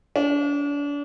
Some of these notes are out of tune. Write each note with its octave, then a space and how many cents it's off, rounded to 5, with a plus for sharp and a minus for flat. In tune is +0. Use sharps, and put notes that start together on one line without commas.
D4 -35